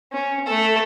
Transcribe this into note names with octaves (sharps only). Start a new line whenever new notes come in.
C#4
A3 A4